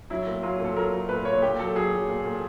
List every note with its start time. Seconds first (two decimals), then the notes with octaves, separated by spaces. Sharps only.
0.10 F#3 E4
0.27 A#2
0.43 F#3 F4
0.60 A#2 A4
0.76 F#3 A#4
0.93 F#3
1.09 A#2 B4
1.25 A#2 C#5
1.42 A#2 G4
1.59 F#3 A4
1.75 F#3 G#4
1.91 F#3
2.09 A#2
2.25 A#2